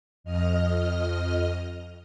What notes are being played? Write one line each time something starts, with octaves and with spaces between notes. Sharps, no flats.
F2 D#5 F6